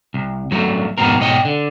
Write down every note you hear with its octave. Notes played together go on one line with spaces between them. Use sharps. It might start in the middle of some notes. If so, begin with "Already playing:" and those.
C2
G2 F#3 A3
F2 G#2 B2 B3 C4 A#4
G#2 B2 C#5 D#5 F5 G5
D3